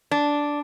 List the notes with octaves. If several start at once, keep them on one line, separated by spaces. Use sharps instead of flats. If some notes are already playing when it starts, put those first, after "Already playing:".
D4